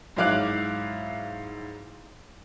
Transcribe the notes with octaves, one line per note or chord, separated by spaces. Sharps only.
G#2 F#3 E4 F5 D6 F#6